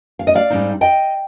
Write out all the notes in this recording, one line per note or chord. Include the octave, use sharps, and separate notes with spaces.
F5
D#5
D5 F5
G#2 G3 C4 D#4
D#5 G5